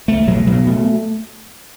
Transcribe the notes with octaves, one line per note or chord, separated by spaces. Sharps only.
C#2 A3
B2 F#3
B2 F#3
B2 A3